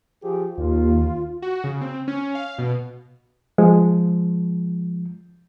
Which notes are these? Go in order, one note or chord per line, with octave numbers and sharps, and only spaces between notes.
F3 G4 G#4
D#2 F4
F#4
C#3
C4
C#4
F5
B2
F3 G#3